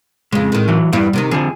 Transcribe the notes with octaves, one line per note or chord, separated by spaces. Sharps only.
F2 C#3 G#3
A2 D#3
E3 F#3
E2 G2 G3 E4
C3 D#3 D#4
F2 D3 F3 G#4